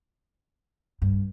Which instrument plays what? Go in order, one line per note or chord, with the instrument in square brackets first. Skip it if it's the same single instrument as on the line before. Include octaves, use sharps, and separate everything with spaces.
[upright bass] G2